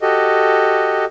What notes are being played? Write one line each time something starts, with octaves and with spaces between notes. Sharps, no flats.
F#4 G4 A4 D#5